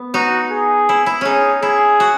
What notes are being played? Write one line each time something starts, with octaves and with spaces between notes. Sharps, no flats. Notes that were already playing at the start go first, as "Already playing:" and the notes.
Already playing: B3
D#4 F#4
G#4
E4
E4
C#4 D#4 G#4
E4 G#4
F#4